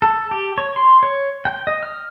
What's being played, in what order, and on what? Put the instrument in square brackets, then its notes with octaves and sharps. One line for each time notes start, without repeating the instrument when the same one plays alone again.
[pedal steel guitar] A4
G4
C#5
C6
C#5
G5
D#5
F6